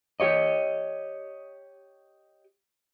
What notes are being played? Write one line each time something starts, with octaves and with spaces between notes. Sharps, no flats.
G4 C#5 D#5